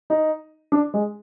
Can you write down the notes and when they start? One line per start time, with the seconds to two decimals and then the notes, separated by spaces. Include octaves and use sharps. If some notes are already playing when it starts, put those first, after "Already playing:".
0.10 D#4
0.72 D4
0.94 G#3